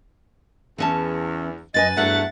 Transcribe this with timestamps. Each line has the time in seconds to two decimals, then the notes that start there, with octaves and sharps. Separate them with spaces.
0.78 E2 E3 C#4 A5
1.74 F#2 B4 D#5 G#5 A6
1.96 E2 G2 F#3 A3 D4 E5 F#5